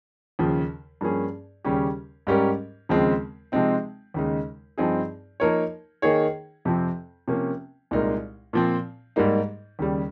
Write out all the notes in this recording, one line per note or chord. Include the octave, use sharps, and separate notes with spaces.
D#2 C#3 F3
G2 F3 A#3 C#4 G#4
D#2 C#3 G3 C#4 G4
G#2 G3 C#4 G4 A#4
D#2 C#3 F3 G#3 C4
C3 F3 G#3 C4 D#4
D#2 C#3 G#3 D#4
G2 F3 C4 D#4 G#4
F3 A#3 D#4 A#4 C#5
D#3 A#3 D#4 G#4 C#5
F2 C3 F3 C4
C3 F3 A#3 C#4
C2 A#2 G#3 D#4 A#4
A#2 F3 C4
G#2 G3 A#3 D#4
D#2 C#3 G3